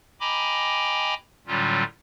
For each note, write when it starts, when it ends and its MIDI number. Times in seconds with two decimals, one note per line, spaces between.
0.20 1.14 75
0.20 1.14 79
0.20 1.14 80
0.20 1.14 82
0.20 1.14 83
0.20 1.14 86
1.47 1.83 45
1.47 1.83 50
1.47 1.83 54
1.47 1.83 55
1.47 1.83 61
1.47 1.83 65